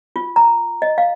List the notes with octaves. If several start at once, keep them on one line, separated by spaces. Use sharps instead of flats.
F4
A#5
D#5
F5